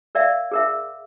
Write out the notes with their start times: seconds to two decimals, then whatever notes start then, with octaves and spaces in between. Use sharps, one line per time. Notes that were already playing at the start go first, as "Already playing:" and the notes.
0.15 A#4 D5 E5 F5
0.51 G#4 A#4 E5